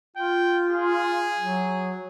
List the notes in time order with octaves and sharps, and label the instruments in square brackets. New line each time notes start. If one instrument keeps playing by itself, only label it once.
[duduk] F4 [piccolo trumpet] G5
[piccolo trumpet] G#4
[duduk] F#3